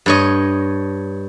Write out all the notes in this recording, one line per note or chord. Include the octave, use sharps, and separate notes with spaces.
G2 C#5 D#5